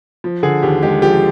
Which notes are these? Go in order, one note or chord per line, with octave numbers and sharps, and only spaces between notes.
F3
D3 G#4
D#2 G4
G#3 G4
F3 G4